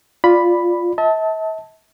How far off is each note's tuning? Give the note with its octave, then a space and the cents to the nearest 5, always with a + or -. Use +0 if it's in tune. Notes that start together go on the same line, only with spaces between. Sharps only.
F4 +0 D5 +5 B5 +0
E5 -45 A5 +0